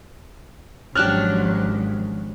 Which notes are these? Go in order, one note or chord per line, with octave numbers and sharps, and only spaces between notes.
G#1 F3 F#3 C#4 D4 G4 F6 F#6